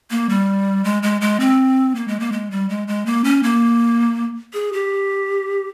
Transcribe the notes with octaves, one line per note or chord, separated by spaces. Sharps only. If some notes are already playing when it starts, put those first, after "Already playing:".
A#3
G3
G#3
G#3
G#3
C4
A#3
G#3
A#3
G#3
G3
G#3
G#3
A#3
C#4
A#3
G#4
G4